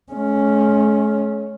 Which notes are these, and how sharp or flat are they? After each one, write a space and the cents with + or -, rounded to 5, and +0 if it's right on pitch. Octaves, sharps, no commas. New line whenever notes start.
G#3 +45 C#4 +0